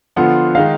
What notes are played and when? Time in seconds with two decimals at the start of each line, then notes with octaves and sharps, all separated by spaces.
0.16 D3 F3 B3 F4 F#5
0.55 D#3 G#3 D#4 F5